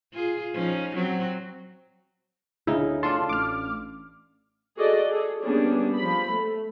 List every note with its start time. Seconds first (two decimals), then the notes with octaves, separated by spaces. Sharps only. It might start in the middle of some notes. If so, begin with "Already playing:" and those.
0.13 F4 G#4
0.54 F3 C#4 D#4
0.95 F#3 C4 F#4
2.67 D2 C#3 D#4 E4
3.03 D4 F4 A4 A5 C6
3.29 A1 D6 F6
4.77 F#4 G#4 A4 D5 D#5
5.08 G#4 A4
5.42 G3 A#3 B3 C#4 D4 G#4
5.97 F3 B5
6.30 A3